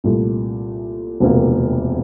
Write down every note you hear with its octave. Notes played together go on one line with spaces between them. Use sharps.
C2 A#2 A3
E1 D2 C3 F3 A#3